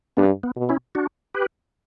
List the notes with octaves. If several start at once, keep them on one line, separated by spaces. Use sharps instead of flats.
G2 B3 D4
B3
B2
C#4 E4
D4 F#4
G4 B4